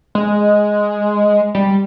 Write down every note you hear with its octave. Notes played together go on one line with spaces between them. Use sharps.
G#3
G3